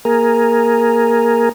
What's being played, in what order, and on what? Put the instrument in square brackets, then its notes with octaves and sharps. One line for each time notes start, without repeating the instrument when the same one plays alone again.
[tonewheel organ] A#3 G#4 A#4